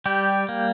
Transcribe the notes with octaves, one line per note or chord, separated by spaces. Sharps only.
G3 G4
A#3